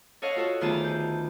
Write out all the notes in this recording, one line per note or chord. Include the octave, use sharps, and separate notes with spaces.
A4 C#5 D#5 F5 F#5
F4 F#4 A4 C#5
D2 D#3 B3 F4 G#4 A5
G6